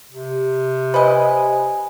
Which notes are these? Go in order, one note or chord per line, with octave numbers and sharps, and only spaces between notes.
C3
B4 C5 D#5 G#5 D#6